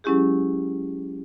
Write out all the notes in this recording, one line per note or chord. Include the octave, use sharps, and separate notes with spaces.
F#3 G#3 C#4 E4 G4 G#4